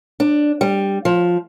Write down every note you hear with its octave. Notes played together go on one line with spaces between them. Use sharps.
D4
G3
F3